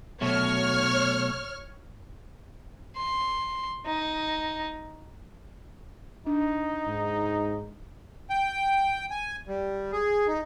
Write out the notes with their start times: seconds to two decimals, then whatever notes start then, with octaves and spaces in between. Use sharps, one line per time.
0.21 B2 F#3 A3 C#5 F6
2.97 C6
3.86 D#4
6.27 D4 D#4
6.87 G#2
8.30 G5
9.10 G#5
9.48 G3
9.92 G#4
10.27 D#4